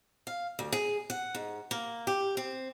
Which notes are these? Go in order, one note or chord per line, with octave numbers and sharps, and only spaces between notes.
F5
D2
G#4
F#5
G#2
A#3
G4
C4